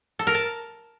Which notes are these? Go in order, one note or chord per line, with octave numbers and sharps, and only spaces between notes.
A4
A#4
A5